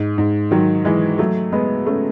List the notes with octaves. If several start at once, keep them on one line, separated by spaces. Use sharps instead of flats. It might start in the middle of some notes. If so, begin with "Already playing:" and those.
Already playing: G#2
G#2
D#3 F#3
E3 G#3
F#3 A3
G#3 B3
A3 C#4